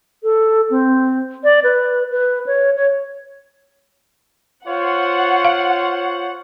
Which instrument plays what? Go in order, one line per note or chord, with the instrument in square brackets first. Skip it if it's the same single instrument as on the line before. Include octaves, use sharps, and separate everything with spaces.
[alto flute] A4
C4
D5
B4
B4
C#5
C#5
[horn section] F4 C5 C#5 [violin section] F#5
[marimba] F5